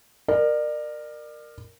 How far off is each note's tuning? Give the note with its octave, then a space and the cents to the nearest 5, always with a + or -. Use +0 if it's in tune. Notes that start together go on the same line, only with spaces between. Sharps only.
A#4 +0 D5 +35